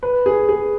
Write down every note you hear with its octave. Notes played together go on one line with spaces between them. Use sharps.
B4
G#4
G#4